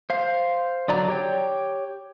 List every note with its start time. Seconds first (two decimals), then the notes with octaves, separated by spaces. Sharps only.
0.10 C5 F5
0.88 D3 F#3 D5 A#5
1.09 G4 C#5 G5